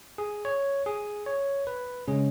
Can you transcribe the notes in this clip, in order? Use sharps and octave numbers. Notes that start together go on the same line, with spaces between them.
G#4
C#5
G#4
C#5
B4
C#3 G#3 C#4 G#4